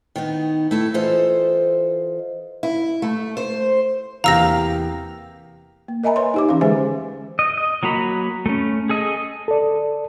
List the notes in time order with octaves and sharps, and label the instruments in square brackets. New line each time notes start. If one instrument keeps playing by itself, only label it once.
[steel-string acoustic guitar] D#3 B3 D#4
A3 E4 A4
E3 F4 A4 C5 D#5
E4
A3
C5
[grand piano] E2 C3 A#3 [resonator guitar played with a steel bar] G4 F5 [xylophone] A#5 E6 A#6
[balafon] A#3
A#4 D#5 E5 G#5 A#5 B5
B4 C#5 G#5 C6
D#4 G4 D6
E3 C#4 F5
D3 G#3 G#4 C5 E5 G#5
[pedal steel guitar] D#5
D#5
F#3 A#3 F#4 A#5 B5
A3 C#4
G#4 A4 D#5
[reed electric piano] A4 D5